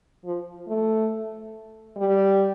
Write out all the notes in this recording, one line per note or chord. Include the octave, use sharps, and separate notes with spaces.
F3
A3
G3